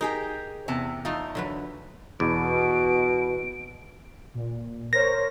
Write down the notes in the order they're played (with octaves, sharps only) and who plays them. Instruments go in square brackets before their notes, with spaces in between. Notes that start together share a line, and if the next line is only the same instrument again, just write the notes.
[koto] D#4 [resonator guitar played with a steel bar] G4 G#4 A#4
[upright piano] E2 [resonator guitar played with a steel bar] C3 A5
[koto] A3 D#4 A4 [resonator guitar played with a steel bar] F4
[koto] D3 F#3 B4
[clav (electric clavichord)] E2 [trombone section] B2 [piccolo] D7
[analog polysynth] A#2
[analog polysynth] A#4 C5 C#5 [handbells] A#6